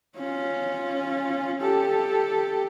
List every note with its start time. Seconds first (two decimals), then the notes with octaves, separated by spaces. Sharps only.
0.16 C#4 F4
1.61 G4 A4